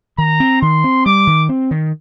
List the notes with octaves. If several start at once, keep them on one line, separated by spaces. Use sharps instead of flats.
D#3 A#5
C4
D#3 C6
C4
G3 D6
D#3
C4
D#3